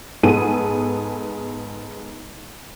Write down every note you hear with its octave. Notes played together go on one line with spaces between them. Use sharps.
G#2 B3 G#4 A4 D#7